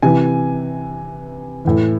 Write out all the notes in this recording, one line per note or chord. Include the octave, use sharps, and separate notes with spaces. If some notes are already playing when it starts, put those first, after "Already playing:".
C3 E3 G#5
A2 E3